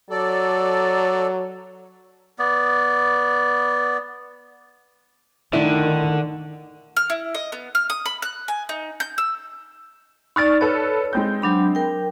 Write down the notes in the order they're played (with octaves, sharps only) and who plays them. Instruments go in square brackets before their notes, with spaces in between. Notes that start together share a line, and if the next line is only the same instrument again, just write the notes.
[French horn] F#3 [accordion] A4 D5
[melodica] B3 D5
[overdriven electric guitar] D3 [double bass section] D#3 [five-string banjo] A3 D4 E4
[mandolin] F6
E4
D#5
B3
F6
D#6
B5
F#6
G#5
D#4
G6
E6
[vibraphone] D#4 D5 [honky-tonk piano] C#6 F6 A6
[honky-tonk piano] A4 B4 [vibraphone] C#5
[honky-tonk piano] G#3 C4 G6
[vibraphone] F#3 D4 B5
A#4 G5